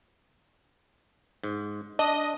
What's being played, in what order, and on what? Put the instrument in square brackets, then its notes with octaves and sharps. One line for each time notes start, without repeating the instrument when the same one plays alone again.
[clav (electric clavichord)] G#2
[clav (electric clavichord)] D4 [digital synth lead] D#5